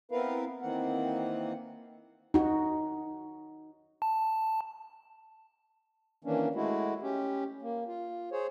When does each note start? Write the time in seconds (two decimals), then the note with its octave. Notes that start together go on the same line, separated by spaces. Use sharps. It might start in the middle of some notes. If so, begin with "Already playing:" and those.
0.11 B3 C4 E4 A#4 B4 F5
0.61 D#3 E3 A#3 C4 F#5
2.34 D#4 F#4
4.02 A5
6.24 D#3 E3 A#3 C#4 D4
6.55 G#3 A3 E4 F#4
7.02 C#4 G4
7.62 A#3
7.87 F4
8.32 G#4 C5 C#5